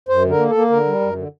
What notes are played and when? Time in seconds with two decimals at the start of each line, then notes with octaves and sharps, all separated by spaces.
0.09 F#2 C5
0.24 D3
0.29 A#4
0.38 A#3
0.49 A4
0.55 A#3
0.70 D3 A#4
0.86 G3
1.00 F#2
1.16 D3